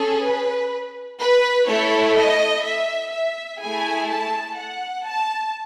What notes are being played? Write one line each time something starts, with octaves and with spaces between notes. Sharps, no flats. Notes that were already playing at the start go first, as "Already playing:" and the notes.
Already playing: C#4 G#4 A4
B4
B4
A3 E4 A4 C#5
D#5
E5
E5
A3 E4 G#4 G#5
A5
F#5
A5